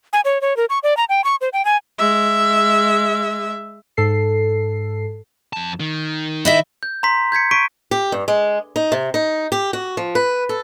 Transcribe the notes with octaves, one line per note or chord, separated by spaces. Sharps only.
G#5
C#5
C#5
A#4
C#6
D5
A#5
G5
C#6
C5
G5
G#5
G#3 E5
G#2 A4 C7
F2 A5
D#3
E4 D#5 E5
G6
A#5 C6 B6
G6 G#6 B6 C#7
C#6 B6 D7 D#7
G4
G2
G#3
D#4
C3
D#4
G4
F#4
F3
B4
A4